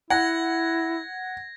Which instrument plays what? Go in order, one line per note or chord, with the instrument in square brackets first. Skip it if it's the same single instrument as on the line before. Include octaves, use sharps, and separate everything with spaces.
[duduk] E4 [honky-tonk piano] F#5 [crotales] G#6 A#6